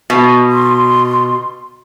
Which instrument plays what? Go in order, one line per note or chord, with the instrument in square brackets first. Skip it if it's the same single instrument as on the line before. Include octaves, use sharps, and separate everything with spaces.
[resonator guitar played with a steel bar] B2
[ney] C6